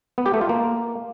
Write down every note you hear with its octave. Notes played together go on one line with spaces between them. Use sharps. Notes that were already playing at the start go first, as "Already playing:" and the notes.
B3
G4
A3
F4
A#3